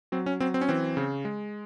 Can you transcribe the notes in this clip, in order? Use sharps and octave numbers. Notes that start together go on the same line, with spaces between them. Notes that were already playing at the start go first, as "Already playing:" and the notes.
F#3 C4
C#4
F#3 C4
C4
C#4
E3 C4
C#3
G#3